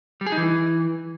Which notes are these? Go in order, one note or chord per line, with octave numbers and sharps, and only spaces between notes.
G3
G#4
D#4
E3